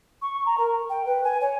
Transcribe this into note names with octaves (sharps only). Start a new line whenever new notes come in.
C#6
A#5
A#4
G5
B4
G#5
C#5